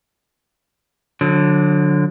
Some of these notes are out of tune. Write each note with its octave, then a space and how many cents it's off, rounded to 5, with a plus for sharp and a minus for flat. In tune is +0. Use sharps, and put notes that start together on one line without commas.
D3 +0 F#3 -35